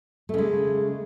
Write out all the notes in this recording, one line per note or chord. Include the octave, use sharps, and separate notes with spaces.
C#3 G#3 A3